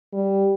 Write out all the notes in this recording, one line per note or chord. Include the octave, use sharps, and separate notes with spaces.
G3